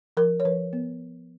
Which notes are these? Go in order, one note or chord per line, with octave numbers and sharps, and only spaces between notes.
F3 A#4
C#5
F3 B4
B3